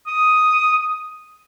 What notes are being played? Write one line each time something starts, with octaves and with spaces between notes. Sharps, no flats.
D#6